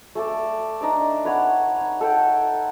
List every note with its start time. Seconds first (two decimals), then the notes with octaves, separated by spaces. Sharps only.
0.15 A3 A4 D5
0.81 D4 D#4 D5 D6
1.25 B4 C#5 F#5
1.81 D#4
2.01 A4 F#5 G5